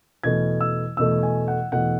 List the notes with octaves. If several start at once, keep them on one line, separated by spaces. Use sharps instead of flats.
E2 B2 A3 G#6
E6
E2 B2 A3 E6
G#5
F#5
E2 B2 A3 F#5